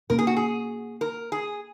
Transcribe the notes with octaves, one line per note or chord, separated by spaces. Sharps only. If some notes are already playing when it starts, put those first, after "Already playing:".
B2 A#3 C#4 A#4
G#4
F#4
G#4
A#4
G#4